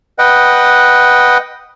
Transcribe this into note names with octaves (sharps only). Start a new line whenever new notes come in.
B4 D#5 F#5 G5